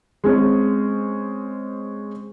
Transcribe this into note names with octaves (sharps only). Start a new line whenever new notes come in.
G#3 C4 C#4